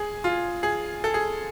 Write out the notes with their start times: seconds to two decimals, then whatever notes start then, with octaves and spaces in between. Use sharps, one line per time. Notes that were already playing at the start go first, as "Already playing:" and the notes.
Already playing: G#4
0.24 F4
0.63 G#4
1.04 A4
1.14 G#4